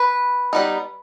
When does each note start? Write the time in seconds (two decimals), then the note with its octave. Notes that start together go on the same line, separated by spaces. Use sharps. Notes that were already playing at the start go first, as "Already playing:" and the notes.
Already playing: B4
0.53 G3 B3 D#4